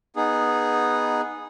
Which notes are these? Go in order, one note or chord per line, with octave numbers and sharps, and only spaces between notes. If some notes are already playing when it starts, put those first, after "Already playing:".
B3 D#4 G#4